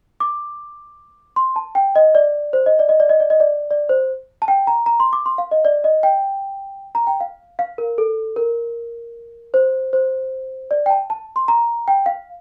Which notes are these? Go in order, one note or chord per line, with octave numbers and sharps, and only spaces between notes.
D6
C6
A5
G5
D#5
D5
C5
D#5
D5
D#5
D5
D#5
D5
D#5
D5
D5
C5
A5
G5
A#5
A#5
C6
D6
C6
F5
D#5
D5
D#5
G5
A#5
G5
F5
F5
A#4
A4
A#4
C5
C5
D5
G5
A5
A5
C6
A#5
G5
F5